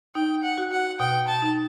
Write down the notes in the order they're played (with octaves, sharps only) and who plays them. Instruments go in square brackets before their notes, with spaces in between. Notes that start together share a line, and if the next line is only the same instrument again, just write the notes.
[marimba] D#4 [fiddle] G5
[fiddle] F#5
[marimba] F#4
[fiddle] F#5
[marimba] B2 [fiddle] G5
[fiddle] A5
[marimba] D#4